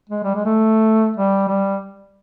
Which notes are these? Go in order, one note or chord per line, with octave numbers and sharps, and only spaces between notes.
G#3
G3
G#3
A3
G3
G3